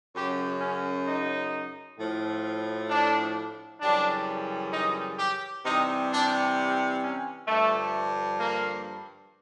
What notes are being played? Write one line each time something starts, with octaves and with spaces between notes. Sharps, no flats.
F#2 C#3 F#3 G4
C#4
D#4
A2 F3
D4
F#2 C#3 E3 G3 D4
D#4
G4
C3 E3 G3 D#4
D4
C#4
G2 D3 F3 A3
A#3